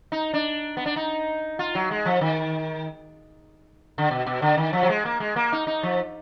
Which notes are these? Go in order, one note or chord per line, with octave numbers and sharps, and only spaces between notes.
D#4
D4
B3
D4
D#4
F4
F#3
G#3
F3
D#3
D3
B2
B2
D3
D#3
F3
F#3
G#3
A#3
G#3
A#3
D#4
D#4
F3